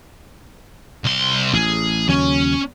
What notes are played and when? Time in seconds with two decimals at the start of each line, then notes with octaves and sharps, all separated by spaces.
1.04 C2 C6
1.53 A1 G#4
2.09 D#2 C#3 F#3 C#4